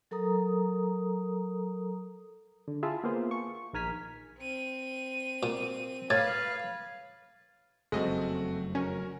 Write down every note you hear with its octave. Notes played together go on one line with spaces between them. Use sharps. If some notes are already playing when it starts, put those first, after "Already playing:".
F#3 A4 A#4 A#5 D#6
D3
E4 F4 G#4 E5 A5
A#3 B3 F4 G#4 C5
C#6
A#1 D#3 A#4 G#5 F6 B6
C4 D#7
A#2
A2 B4 F5 G#6 A6
F#1 F2 G#3 A3 C4 F#4 D#5
C#4 F#4 A#4